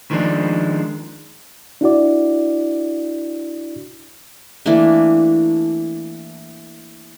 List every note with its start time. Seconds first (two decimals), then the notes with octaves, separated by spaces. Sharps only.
0.11 D#3 F3 G#3 D4
1.81 D4 E4 F#4 D5
4.66 E3 A3 A#3 D4